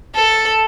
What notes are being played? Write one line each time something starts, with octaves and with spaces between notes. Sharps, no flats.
A4